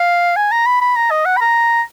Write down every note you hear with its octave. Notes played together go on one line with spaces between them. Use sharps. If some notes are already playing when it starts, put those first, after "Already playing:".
Already playing: F5
G#5
A#5
B5
B5
A#5
D#5
F#5
B5
A#5